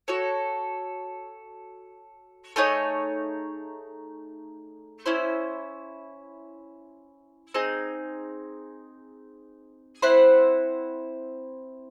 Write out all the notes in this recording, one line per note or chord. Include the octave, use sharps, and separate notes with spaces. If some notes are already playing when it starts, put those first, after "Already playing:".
F#4 A4 C#5
A3 D#4 G#4 C#5
C#4 E4 C5
C4 D#4 G#4
C4 E4 C5 F#5